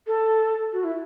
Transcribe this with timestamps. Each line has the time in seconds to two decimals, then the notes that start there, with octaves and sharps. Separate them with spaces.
0.07 A4
0.73 F#4
0.84 E4